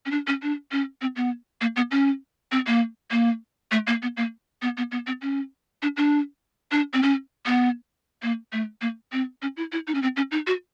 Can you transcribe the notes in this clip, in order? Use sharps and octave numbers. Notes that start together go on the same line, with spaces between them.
C#4
D4
C#4
D4
C#4
C4
B3
A#3
B3
C#4
C4
A#3
A#3
A3
A#3
B3
A#3
B3
B3
B3
C4
C#4
D4
D4
D4
C4
C#4
B3
A#3
A3
A#3
C4
C#4
E4
E4
D#4
C#4
C4
C#4
D#4
F#4